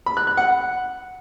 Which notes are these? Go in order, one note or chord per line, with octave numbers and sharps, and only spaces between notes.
B5
F#6
F#6
F#5